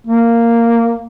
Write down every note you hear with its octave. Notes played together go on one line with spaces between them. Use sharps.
A#3